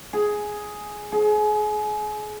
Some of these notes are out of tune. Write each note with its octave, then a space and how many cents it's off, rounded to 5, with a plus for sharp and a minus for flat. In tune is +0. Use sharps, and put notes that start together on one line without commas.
G#4 +5
G#4 +30